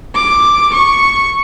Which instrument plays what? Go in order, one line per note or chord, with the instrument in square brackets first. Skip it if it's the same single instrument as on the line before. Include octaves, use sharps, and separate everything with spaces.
[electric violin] D6
C#6